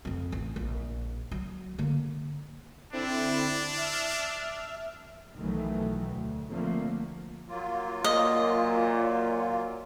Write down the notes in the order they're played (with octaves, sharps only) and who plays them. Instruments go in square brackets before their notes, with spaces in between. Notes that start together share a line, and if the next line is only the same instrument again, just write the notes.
[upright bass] F2 C4
A1
A#1
F#3
D3 A#3
[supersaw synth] D3 C4 E4 [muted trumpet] D4
[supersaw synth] E5 F6
[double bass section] B1 B2 D#3 E3 F#3 A3
D2
A1 D3 F3 A3 A#3 C4
[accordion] F#3 A#3 F4
[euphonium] A#2 [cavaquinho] D#5